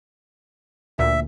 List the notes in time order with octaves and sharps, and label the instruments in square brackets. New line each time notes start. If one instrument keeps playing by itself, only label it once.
[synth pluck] D2 A#2 [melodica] E5